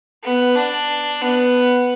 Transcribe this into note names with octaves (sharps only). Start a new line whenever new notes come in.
B3
D4
B3